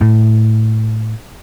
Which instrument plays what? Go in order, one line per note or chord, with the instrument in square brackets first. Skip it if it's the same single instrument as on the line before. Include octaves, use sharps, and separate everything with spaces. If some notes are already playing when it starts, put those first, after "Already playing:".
[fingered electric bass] A2